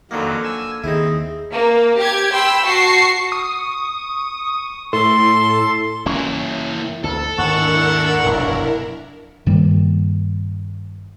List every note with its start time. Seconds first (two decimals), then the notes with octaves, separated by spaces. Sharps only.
0.11 F2 D3 D#3 F#3 A#3
0.44 G#5 E6
0.84 D#2 C4 D#4 E4 G#4
1.51 A#3
1.96 G4 G#6
2.32 G5 B5 C6 E6
2.63 F#4 A5 C#6 C7
3.32 C#6 D#6
4.93 A2 A4 C6
6.06 E3 A#3 C#4 E4
7.04 D2 A4
7.38 D#2 G#2 D4 E4 A#4 F#5 C#6
8.24 F1 B1 G2
9.46 G2 D#3 G3 A#3